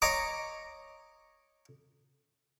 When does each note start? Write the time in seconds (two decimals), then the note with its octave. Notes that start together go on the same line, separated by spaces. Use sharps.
0.02 C#5 D#5 A#5 D6 D#6